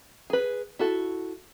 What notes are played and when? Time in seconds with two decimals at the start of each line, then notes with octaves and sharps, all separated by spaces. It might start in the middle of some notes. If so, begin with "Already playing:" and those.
0.30 G#4 B4
0.79 E4 F#4 A4